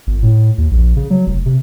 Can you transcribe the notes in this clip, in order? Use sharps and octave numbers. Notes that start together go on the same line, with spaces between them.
G1
A2
D#2
A#1
C#3
F#3
F1
C3